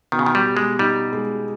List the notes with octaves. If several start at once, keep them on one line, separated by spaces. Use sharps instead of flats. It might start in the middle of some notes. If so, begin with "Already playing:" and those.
B2 D#3
C#3
D#3
G3
G4
G#3
G3 D#4
G#3